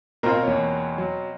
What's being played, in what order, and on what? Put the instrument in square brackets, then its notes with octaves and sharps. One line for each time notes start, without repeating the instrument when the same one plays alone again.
[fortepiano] B2 C4 F4 [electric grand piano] A#4 A#5
[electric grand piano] E2 A#3 C#5
F#3